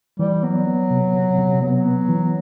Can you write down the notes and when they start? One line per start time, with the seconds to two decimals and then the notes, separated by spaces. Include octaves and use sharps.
0.19 E3 G3
0.43 F#3 B3
0.67 B3
0.91 C3
1.14 C3
1.38 C3
1.62 F#3 B3
1.85 B3
2.09 E3